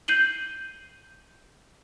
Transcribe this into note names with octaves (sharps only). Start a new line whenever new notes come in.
G6 C7 D#7 F#7 G7